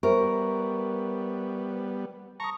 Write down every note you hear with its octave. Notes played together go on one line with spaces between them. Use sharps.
G3 B3 A#4 C5 E5 C#6
A5 A#5 C#6 D#6